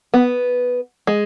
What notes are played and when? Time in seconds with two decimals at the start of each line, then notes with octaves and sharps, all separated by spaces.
0.14 B3
1.07 G#3